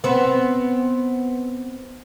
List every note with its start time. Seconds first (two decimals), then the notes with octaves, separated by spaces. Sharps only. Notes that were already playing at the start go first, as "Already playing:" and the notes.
0.04 B3 C4